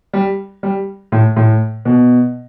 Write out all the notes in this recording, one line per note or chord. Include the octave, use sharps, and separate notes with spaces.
G3
G3
A2
A2
B2